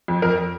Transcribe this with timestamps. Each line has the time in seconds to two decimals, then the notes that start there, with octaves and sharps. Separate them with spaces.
0.08 F2
0.22 F2 A#4